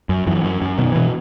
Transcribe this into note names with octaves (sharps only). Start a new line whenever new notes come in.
F#2
F#2 E3
F#2
F#2
B2 D#3
B2 E3